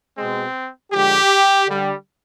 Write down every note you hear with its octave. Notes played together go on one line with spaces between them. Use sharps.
B2 G#3 C4
D3 F3 G#3 G4
D3 G3